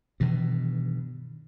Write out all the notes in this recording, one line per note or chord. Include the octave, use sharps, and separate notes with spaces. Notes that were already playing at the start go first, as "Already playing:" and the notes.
G2 B2 D#3 E3